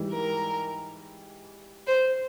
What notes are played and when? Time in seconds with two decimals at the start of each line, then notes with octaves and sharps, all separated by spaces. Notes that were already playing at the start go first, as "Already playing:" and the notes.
Already playing: G#2 E3 G3
0.12 A#4
1.87 C5